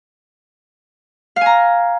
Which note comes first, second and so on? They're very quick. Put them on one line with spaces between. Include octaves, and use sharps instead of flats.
F5 G#5 A#5